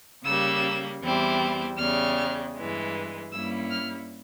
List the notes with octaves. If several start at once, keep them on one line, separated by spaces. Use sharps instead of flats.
C#3 G3 A#3 E6
E2 E3 G3 C4 E4
E2 C#3 G3 F6
G2 E3 G#3
G2 G3 A#3 C#4 E4 E6
F6